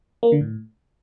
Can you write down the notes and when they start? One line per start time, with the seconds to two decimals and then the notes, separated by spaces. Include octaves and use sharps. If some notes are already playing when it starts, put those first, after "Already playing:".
0.23 A#3
0.32 D3
0.41 A2